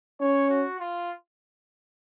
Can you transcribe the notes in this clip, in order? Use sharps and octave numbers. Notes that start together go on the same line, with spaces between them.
C#4 C#5
F#4
F4